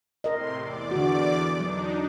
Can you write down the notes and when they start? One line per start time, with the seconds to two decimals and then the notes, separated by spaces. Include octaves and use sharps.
0.24 A2 C3 A#4 D#5 C6
0.57 E2 D5 D6
0.91 D3 F#4
1.60 F#3 D4 D#4